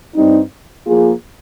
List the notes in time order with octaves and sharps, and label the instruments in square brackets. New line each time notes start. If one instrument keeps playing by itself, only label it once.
[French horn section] G2 G3 C4 D#4
F3 A#3 F4 G#4